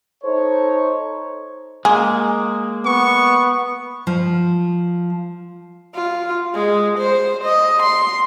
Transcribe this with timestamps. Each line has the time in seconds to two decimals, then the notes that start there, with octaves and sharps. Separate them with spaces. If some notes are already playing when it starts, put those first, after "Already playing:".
0.24 D#4 A4 C5 C#5
1.85 G#3 A#3 G#4
2.85 B3 C#6
4.07 F3
5.95 F4
6.54 G#3
6.98 C5
7.43 D#5
7.82 C6